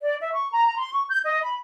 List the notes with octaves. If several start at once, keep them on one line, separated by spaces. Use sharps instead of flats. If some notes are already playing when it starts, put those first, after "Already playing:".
D5
E5
C#6
A#5
A#5
C6
C#6
G6
D#5
B5